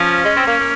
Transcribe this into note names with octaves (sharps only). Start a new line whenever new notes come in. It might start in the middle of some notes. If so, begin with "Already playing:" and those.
Already playing: F3 C#4
G#3
C4
A#3
A#3